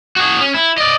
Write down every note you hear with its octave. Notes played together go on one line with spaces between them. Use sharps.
F#4 G#4
C#4
E4
D5 D#5